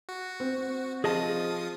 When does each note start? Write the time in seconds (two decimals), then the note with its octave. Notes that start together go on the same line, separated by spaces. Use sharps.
0.09 F#4
0.40 C4
1.04 F3 F4 G#4 D#5 A5 D#6